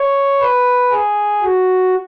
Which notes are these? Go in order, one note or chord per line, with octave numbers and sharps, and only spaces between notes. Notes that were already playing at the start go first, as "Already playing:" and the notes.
Already playing: C#5
B4
G#4
F#4